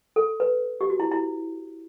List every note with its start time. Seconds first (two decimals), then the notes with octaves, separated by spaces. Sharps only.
0.16 A4
0.40 B4
0.81 G4
0.90 F#4
1.00 E4
1.11 E4